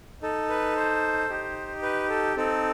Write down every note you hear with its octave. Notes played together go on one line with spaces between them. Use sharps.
D#4 A4
B4
C5
D#4 G4
B4
A4
C4 D#4 A4